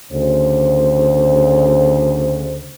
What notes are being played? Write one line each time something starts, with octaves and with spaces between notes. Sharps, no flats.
D2 C#3 C5